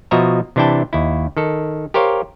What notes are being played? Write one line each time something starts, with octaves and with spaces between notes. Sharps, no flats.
B2 F3 F#4 D#5 E5 A#5
C3 E3 D4 E4 G5 A5
D#2 E4
D#3 A4
G4 A#4 C5 C#5 F5